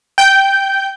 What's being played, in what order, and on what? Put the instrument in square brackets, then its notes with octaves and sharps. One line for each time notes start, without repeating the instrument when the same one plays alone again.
[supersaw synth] G5 G6